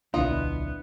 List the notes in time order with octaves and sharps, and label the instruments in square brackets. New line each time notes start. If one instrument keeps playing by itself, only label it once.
[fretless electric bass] D1 B1 [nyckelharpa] B3 [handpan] D4 E4 [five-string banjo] F4 D#5